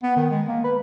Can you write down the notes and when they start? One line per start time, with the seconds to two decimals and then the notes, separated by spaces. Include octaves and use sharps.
0.03 B3
0.16 D#3
0.31 G#3
0.48 A#3
0.64 B4